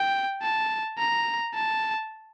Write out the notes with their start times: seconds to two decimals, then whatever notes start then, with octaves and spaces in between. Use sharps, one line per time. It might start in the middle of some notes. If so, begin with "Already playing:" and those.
Already playing: G5
0.42 A5
0.98 A#5
1.54 A5